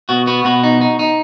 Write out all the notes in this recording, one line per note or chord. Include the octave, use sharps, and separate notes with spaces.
B2 F#4
B3 F#4
B2 F#4
D#4
D#4
D#4